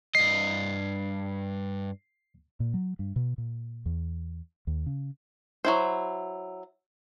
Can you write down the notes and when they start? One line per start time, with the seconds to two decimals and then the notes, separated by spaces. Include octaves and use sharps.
0.15 G2 D#5 C7
2.60 A#2
2.74 F#3
2.99 G2
3.16 B2
3.38 A#2
3.86 E2
4.67 D#2
4.86 C#3
5.65 F#3 E4 C5